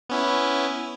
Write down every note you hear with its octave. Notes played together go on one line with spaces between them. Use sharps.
B3 C#4 E4